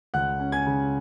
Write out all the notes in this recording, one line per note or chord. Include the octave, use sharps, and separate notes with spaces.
C#2 F#5 F#6
C#4
G#5 G#6
C#3